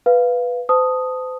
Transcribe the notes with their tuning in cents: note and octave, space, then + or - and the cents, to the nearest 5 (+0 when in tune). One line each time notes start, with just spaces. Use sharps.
B4 +0 F5 +0
C5 -40 A5 +0 D#6 +0